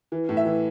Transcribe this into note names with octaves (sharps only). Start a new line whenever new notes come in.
E3
A2
E5
E3